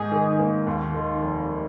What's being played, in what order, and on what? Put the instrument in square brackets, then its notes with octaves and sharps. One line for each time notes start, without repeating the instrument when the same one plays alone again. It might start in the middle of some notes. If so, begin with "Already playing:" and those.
Already playing: [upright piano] G#2 D#3 D#4 [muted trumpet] G#4
[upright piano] D#3
A#3
[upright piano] D#2 [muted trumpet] F4
[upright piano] D#3
F1